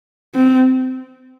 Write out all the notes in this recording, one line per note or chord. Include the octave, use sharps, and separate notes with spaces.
C4